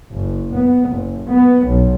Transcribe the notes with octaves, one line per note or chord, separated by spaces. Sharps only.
F#1
B3
F#1
B3
B1